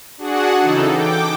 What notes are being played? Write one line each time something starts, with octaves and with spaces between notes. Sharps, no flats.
D4 F#4 G#4 F#5
C#3 E3 D#4 A4
G5 D6